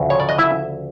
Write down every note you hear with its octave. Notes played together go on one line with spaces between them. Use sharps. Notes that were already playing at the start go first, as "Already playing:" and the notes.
Already playing: D2 C#3 F3 A3
C#5
D5
D#5
E4 E5